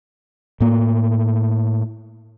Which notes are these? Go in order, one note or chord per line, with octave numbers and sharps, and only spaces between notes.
A2 A#3